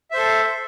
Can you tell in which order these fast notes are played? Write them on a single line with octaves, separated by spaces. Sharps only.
E5 C5 A4